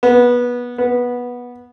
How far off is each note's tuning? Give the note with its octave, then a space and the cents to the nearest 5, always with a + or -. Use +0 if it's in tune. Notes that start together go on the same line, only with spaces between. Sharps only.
B3 -20
B3 -15